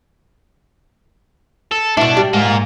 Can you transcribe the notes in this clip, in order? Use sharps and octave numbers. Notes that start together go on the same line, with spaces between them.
A4
B2 D4 E4
G3
G#2 A#3 F4